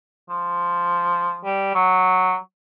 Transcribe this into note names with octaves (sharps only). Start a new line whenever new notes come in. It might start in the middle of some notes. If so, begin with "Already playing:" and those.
F3
G3
F#3